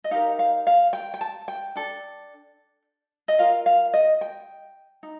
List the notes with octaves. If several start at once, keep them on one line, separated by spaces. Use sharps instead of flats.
D#5
D#4 G4 A#4 F5
F5
F5
G5
G5
A5
G5
D4 A4
D#5
F4 A#4 F5
F5
D#5
G5
D#4